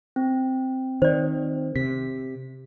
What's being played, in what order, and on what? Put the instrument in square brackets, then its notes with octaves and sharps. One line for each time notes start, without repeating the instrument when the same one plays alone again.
[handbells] C4
[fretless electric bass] D#3 [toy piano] C5 D5
[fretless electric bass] C3 [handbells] B6